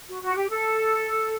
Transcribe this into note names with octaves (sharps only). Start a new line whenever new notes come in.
F#4
F#4
G4
A4